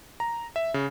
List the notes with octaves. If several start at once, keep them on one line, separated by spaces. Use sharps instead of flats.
A#5
E5
C#3